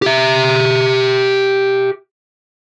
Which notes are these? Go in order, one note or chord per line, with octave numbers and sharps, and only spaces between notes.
G4 E5